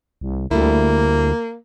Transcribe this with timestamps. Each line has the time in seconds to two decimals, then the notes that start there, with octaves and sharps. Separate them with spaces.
0.21 C2
0.51 D2 G3 A3 A#3 E4